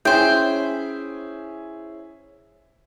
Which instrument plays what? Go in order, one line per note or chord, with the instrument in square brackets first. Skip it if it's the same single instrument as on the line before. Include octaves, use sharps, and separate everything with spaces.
[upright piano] C#4 E4 G#4 [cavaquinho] C5 G5